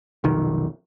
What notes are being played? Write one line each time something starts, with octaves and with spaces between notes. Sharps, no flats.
F1 B1 D#3